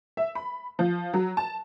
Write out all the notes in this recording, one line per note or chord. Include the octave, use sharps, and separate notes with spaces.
E5
B5
F3
F#3
A5